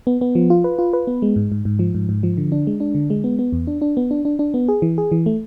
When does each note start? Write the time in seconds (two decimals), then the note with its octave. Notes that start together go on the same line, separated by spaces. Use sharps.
0.07 B3
0.21 B3
0.35 F3
0.50 F4
0.64 B4
0.79 F4
0.93 B4
1.07 B3
1.22 G#3
1.36 G#2
1.52 G#2
1.65 G#2
1.79 F3
1.95 G#2
2.09 G#2
2.23 F3
2.37 D3
2.52 D4
2.67 G#3
2.80 D4
2.95 D3
3.10 G#3
3.24 B3
3.39 B3
3.53 E2
3.67 D4
3.82 D4
3.97 B3
4.11 D4
4.25 D4
4.39 D4
4.54 B3
4.68 G#4
4.82 E3
4.98 G#4
5.12 E3
5.26 A3